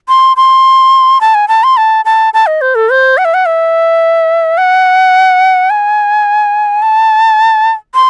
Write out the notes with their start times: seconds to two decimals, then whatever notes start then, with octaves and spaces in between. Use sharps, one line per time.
0.09 C6
0.37 C6
1.21 A5
1.34 G#5
1.48 A5
1.64 C6
1.77 A5
2.05 A5
2.34 A5
2.47 D#5
2.61 C5
2.75 A4
2.90 C5
3.18 F#5
3.25 E5
3.34 F#5
3.46 E5
4.58 F#5
5.70 G#5
6.82 A5
7.95 C6